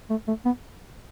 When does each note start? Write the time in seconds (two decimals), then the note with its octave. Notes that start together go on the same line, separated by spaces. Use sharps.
0.10 A3
0.28 A3
0.45 B3